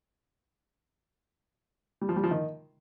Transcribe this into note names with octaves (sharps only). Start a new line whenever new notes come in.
G3
F3
G3
F3
D#3